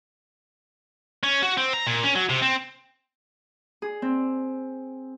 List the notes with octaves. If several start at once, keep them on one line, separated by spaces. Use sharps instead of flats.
C#4
F#4
C4
A#5
A#2
C#4
F#3
C3
C4
G#4
C4